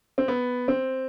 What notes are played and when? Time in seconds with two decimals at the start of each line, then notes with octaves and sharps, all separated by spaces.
0.18 C4
0.28 B3
0.68 C4